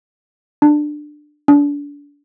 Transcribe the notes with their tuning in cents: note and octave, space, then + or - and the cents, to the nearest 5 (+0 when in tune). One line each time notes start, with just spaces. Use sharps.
D4 +20
D4 -30